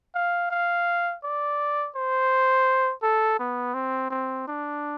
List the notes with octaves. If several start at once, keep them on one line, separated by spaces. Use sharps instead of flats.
F5
F5
D5
C5
A4
B3
C4
C4
D4